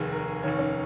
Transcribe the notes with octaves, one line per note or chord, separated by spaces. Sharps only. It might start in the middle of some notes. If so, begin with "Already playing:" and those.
Already playing: F1 D#2 D#3 G#4
A#4
F1 D#2 D#3 C#5
C#4